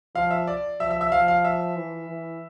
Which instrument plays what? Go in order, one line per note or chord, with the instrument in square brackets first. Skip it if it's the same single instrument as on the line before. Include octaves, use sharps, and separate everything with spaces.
[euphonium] F3 [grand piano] F5
[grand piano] E5
D5
[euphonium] F3 [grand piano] E5
[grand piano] E5
E5
[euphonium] F3 [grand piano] F5
[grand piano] F5
E5
[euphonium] E3
E3